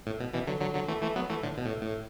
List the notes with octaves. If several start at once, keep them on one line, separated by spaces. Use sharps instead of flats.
A2
B2
B2 E3
D3 F#3
D3 F#3
D3 F#3
E3 A3
E3 A3
F#3 B3
E3 A3
A2 D3
B2
A2
A2